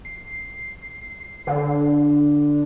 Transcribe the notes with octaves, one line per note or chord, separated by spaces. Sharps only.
C7
D3